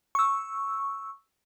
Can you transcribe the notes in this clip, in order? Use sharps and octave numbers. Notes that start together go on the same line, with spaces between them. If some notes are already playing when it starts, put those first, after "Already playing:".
C#6 E6